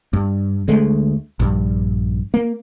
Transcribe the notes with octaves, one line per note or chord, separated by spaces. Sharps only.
G2
D2 G#3 A3
A#1 G2
A#3